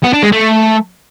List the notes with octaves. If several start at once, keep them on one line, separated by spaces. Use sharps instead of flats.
B3
D4
G#3
A3